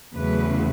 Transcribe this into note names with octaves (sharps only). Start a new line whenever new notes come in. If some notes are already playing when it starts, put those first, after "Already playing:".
E2 C#3 F#3 A3 B4